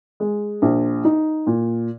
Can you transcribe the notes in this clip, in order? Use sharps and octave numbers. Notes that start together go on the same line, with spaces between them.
G#3
A#1
D#4
A#2